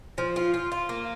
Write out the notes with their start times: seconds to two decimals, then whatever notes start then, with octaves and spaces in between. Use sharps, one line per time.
0.18 F3
0.36 F4
0.54 F4
0.72 F4
0.89 A#3